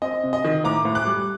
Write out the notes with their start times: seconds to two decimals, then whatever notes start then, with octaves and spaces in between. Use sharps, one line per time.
0.02 C4 D#5
0.23 C3
0.33 D#5
0.44 D#3
0.64 A2 A#5 D6
0.85 A2
0.95 D6 F#6
1.07 G3